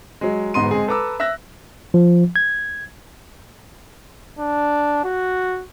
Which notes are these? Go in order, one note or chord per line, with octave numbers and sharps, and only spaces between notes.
F#3 G#3
D1 G#2 B3 D#5 C6 D#7
G#3 C4 G#4
A4 B4 A#5 D6 E6
E5 E6 F#6 A#6
F3
G#6
D4
F#4